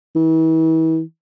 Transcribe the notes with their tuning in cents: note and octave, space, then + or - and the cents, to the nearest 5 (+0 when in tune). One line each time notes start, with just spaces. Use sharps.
E3 -40